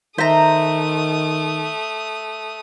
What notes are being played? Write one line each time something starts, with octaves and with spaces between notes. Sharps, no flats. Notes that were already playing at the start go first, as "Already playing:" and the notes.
D#3 A3 C5 E5 A#5 D#6